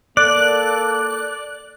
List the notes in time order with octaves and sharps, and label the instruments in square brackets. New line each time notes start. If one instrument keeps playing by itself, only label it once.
[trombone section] A#3 A4 [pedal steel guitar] D5 [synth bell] F#6